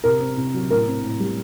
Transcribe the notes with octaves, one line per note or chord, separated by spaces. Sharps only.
C3 A#4
C4
C3
F#3
A2 A#4
C4
A2
G3